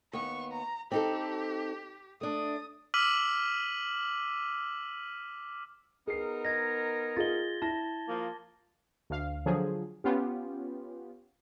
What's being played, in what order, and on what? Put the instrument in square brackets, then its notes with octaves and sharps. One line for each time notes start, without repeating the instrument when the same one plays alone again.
[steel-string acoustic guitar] D#2 B3 [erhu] C#6
[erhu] A#5
[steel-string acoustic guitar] C4 D#4 A4 [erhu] G4
[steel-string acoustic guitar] A3 D4 [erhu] D#6
[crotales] D6 E6 F6 B6 D#7 F#7
[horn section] B3 D#4 A#4 [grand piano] G#4 C7
[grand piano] D#5 [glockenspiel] G#6 A#6
[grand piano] F4 G#4 D#5 [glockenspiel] A6 G7
[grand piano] E4 A#6 [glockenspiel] A5
[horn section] F3 A#3
[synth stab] D2 F5
D3 F3 F#3 G#4
B3 C#4 F4 G4